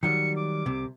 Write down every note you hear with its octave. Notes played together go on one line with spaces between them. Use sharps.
D#3 F#3 G3 C#7
D6
C2 C3